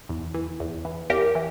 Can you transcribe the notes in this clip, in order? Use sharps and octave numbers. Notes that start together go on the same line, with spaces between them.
E2
E3
E2
E3
E2 G4 A#4
E3